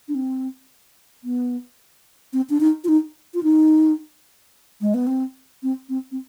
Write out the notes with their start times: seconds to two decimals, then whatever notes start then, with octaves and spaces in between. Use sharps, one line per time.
0.08 D4
0.15 C4
1.24 B3
2.33 C4
2.50 D4
2.60 D#4
2.84 F4
2.88 D#4
3.34 F4
3.43 D#4
4.81 G#3
4.94 B3
5.07 C4
5.63 C4
5.89 C4
6.12 C4